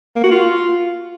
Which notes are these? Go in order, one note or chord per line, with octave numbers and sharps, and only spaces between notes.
A#3
F#4
F4